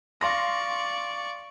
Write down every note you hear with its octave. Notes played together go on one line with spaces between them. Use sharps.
D5 F5 C6 C#6 A#6